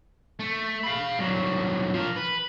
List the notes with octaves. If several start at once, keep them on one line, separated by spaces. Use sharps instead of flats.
A3
F5 B5
C2 F#3
F3 A#4
B4